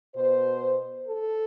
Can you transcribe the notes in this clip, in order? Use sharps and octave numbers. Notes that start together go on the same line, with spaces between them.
B2 C5
A4